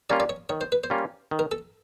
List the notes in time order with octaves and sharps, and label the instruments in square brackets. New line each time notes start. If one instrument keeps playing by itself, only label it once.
[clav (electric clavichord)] G3 A#3 C#4 F4 [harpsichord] D5
[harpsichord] D5
C#5
[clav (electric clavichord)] D#3 [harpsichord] C#5
[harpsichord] C5
B4
C5
[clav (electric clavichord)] G3 A#3 C#4 F4
D#3
[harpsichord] A#4
A4